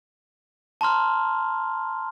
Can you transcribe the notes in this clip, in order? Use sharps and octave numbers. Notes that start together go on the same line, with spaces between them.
A5 A#5 C6 F6